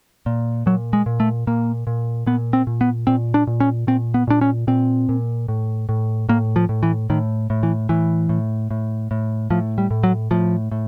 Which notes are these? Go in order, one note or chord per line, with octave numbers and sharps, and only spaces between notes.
A#2
A#2 F#3
G#3
A#2
A3
A#2 A#3
A#2
A#2 B3
C4
A#2
B3
A#2 C4
D4
A#2
C#4
A#2 C4
B3
A#2 D4
C#4
A#2 C4
A#2
A2
A2
A2 A#3
F3
A2
E3
A2 D#3
A2
E3
A2 E3
A2
A2
A2
A2 F3
G3
A2
F#3
A2 F3
A2